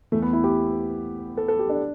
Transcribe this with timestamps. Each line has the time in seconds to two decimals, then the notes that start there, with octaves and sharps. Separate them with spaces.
0.12 E2 E3 A3
0.22 B3
0.33 E4
0.44 G4
1.37 A4
1.48 A4
1.59 G4
1.69 D4